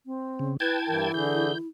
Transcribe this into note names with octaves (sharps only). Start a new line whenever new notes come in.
C4
C#3
E4 B4 G5 A5 G#6
G2 E3 A#4
D3 G#4 G6